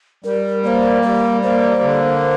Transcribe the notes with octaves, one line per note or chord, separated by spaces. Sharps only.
G3 A#4
A#3 C5 D5
G3 A#4
A#3 C5
D3